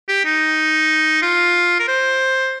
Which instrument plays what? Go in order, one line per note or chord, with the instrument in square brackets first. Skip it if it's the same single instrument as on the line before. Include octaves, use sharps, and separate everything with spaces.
[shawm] G4
D#4
F4
A#4
C5